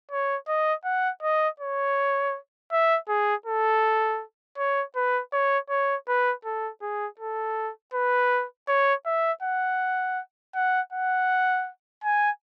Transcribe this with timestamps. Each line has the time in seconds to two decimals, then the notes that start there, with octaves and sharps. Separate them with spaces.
0.11 C#5
0.48 D#5
0.84 F#5
1.23 D#5
1.60 C#5
2.72 E5
3.09 G#4
3.46 A4
4.58 C#5
4.96 B4
5.33 C#5
5.70 C#5
6.08 B4
6.45 A4
6.81 G#4
7.19 A4
7.94 B4
8.68 C#5
9.06 E5
9.42 F#5
10.55 F#5
10.92 F#5
12.04 G#5